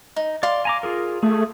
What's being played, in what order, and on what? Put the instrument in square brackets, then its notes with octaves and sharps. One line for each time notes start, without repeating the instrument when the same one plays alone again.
[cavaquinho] D#4
[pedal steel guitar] D5 [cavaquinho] F5 C6
[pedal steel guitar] G#5 A#5 D6
F4 G#4 A#4
[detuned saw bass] A3 [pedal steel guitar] G#4